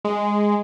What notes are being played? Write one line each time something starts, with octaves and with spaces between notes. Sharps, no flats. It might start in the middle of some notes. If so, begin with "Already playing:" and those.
G#3